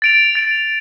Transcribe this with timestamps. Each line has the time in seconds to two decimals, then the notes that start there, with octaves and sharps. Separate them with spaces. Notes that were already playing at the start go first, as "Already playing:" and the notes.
0.02 A6 D7 F7
0.35 A6 D7 F7